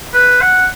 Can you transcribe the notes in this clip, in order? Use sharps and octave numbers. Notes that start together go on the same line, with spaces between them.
B4
F#5